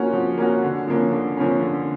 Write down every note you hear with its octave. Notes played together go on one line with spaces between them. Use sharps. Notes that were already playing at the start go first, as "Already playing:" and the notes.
Already playing: F3 A#3 C#4 F#4
F3
A#3 C#4 F#4
D3
F3 A#3 C#4
D3
F3 A#3 C#4
D3